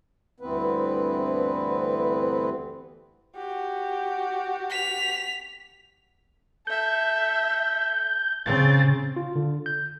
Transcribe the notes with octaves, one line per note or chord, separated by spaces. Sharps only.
D2 G2 E3 B3 C4 B4
F#4 G4
B6 F7
A4 E5 G6
C#3 C4 A6
F4
D3
G6